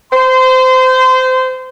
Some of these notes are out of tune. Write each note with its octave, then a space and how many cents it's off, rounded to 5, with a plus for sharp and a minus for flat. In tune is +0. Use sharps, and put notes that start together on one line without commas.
C5 -20 C6 -30